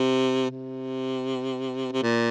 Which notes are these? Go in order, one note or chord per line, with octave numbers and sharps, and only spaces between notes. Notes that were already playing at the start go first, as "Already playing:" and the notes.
Already playing: C3
C3
C3
A#2